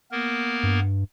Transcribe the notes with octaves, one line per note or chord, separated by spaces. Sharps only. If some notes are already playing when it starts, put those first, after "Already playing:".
A#3 B3 A#4
G2